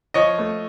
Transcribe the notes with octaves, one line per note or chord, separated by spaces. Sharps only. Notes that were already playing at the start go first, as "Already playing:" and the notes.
F3 C#5 D#5
A3